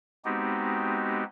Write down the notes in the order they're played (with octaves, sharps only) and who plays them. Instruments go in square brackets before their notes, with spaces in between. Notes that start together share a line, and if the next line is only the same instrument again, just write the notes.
[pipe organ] G#3 B3 C4 D#4 F#4 G4